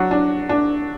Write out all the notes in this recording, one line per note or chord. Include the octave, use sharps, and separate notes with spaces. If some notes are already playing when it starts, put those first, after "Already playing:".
Already playing: F#3 D4 F#4
D4
D4